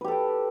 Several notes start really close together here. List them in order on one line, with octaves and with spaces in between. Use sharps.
B4 G4 A4 G5